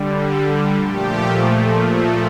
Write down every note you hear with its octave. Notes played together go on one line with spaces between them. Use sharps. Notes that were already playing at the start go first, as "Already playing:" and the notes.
Already playing: D3 G3
A4
A#2 F3 A3 G4
A#2 F3 A3